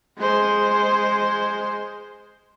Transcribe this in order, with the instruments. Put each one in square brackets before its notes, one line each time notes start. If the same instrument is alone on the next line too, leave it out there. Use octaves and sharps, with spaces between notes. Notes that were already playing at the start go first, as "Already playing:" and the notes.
[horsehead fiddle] G#3 C5